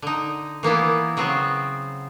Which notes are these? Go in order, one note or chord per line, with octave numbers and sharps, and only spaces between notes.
D3 D#4
E3 A#3 B3 E4
C#3 F#3 B3 C4